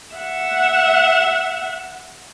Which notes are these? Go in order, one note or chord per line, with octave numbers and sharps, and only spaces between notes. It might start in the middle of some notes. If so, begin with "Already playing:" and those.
E5 F#5